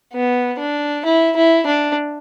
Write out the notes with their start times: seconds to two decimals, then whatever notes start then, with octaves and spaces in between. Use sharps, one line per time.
0.14 B3
0.59 D4
1.05 E4
1.36 E4
1.66 D4